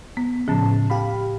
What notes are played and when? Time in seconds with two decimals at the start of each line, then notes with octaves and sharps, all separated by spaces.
0.17 B3
0.48 A2 C#3 F3 A5
0.90 G4 F5 B5